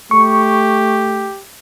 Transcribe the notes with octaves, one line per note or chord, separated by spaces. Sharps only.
A3 G4 C#6